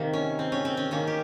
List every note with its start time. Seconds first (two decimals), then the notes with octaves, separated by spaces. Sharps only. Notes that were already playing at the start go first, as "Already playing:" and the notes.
Already playing: C3 D#3 A#3
0.13 C#4
0.39 C4
0.52 C#4
0.65 C4
0.77 C#4
0.91 D#3 A#3 C#4
1.07 G4